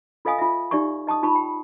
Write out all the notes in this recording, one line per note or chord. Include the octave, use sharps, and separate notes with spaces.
F4 A4 D#5 F5 G#5 D#6
F4 E5
D#4 G4 D5 E5 C#6
D#5 A5 C#6 D#6
D#4 F4 A5 B5 C#6
G5